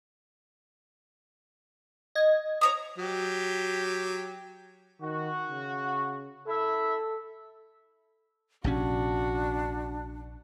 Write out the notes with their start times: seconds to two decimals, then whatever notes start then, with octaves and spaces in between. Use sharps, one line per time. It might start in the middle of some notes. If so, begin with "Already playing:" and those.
2.15 D#5 G#6
2.61 C#5 A#5 D#6
2.98 F#3 G4
5.01 D#3 F#4
5.49 C#3
6.48 E4 A4 E5
8.64 A#1 C3 C#4 D4 F#4